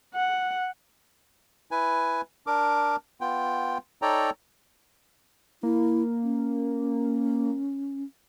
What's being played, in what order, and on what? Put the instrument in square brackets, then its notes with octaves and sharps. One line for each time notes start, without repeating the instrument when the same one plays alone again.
[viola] F#5
[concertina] E4 B4 G#5
D4 A#4 D6
B3 F4 G5
D#4 A4 C#5 D5 G5 A#5
[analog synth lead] A#3 [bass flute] E4
[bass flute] C#4